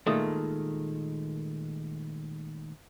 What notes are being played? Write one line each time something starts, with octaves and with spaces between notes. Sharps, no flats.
A#2 D#3 G#3 A3